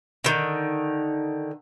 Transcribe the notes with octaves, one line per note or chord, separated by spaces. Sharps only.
D3 D#3